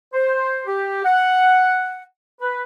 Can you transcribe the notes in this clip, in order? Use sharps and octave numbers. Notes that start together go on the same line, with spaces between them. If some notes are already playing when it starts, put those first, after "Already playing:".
C5
G4
F#5
B4